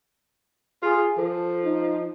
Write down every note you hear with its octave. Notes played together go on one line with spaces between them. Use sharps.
F4 G#4
F3 A4
D#4